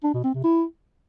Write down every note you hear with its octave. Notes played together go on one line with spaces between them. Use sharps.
D4
B2
C4
C3
E4